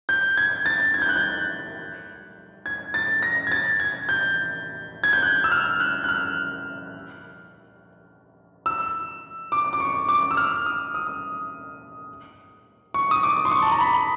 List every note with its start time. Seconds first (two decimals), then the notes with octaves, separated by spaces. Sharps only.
0.09 G6
0.37 G#6
0.66 A6
0.94 G#6
1.02 G6
1.09 F#6
1.16 G6
2.66 G#6
2.94 A6
3.23 A#6
3.47 G#6
3.52 A6
3.80 G#6
4.09 G6
5.04 G#6
5.13 G6
5.23 F#6
5.44 E6
5.52 F6
5.80 F#6
6.04 F#6
6.09 F6
8.66 E6
9.52 D6
9.73 D6
9.80 C#6
10.09 D6
10.31 E6
10.37 F6
10.66 D#6
10.94 D#6
12.94 C#6
13.11 D#6
13.23 D6
13.45 C6
13.51 C#6
13.62 A5
13.72 A#5
13.81 B5